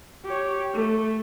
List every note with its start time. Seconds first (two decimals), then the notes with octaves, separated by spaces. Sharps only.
0.25 G4 C#5
0.74 A3